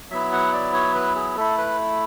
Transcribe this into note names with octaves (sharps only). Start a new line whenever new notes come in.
F#3 B3 E4 E5
F#5
D5
C#5
B4
G#4
A3 E4 A4
B4